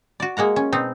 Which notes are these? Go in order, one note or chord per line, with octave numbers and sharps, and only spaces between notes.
F#4 D5
G#3 A#3 F#5 A#5
C#4
B2 C4 D#4